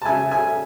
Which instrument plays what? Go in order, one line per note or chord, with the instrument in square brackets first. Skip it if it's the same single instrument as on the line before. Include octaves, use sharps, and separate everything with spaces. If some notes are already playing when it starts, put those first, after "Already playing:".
[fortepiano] A5
C#3 F#3 C#4 E5 G#5
E5 G#5